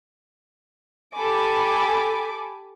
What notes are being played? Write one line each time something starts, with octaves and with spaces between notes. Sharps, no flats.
G4 A4 G#5 B5 D6